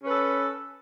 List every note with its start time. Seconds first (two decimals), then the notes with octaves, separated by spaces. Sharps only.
0.03 C#4
0.06 B4
0.09 A4